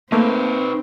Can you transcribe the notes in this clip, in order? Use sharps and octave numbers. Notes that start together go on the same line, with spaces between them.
A3 A#3 C4 D#4 B4